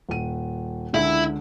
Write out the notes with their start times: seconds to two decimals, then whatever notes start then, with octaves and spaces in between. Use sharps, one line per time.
0.09 D#1 D#7
0.94 C#2 D3 E4 E5